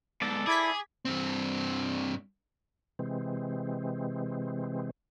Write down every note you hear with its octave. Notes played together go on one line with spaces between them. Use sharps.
G#2 B2 A4 D5
E4 G#4 D6 G#6 B6
G2 C4
C3 E3 G#3 C4